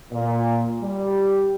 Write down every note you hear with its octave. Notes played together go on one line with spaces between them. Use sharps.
A#2
G3